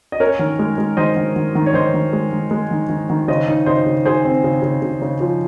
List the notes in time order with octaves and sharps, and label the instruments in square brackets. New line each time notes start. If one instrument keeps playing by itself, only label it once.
[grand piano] D#5
C#4 A#4 C#5
D#3
G#3
G#3
D#3 C5 D#5
D#3
D#3
D#3
C#5
D#3 C5 D#5
D#3
G#3
D#3
G#3
D#3
D#3
D#3
C#3 C5 D#5
D#4
C#3 C5 D#5
C#3
D#4 G#4 C5
C4
C#3
C#3
C#3
C#3
F3